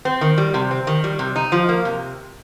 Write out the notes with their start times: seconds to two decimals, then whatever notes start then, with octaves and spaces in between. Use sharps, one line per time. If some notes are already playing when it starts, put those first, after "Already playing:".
0.05 C4
0.21 D#3
0.38 G3
0.54 C3
0.71 C4
0.87 D#3
1.04 G3
1.19 C3
1.36 D#4
1.52 F3
1.69 A#3
1.85 C3